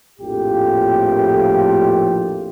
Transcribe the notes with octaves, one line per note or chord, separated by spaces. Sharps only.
A#1 F2 A2 F4 G4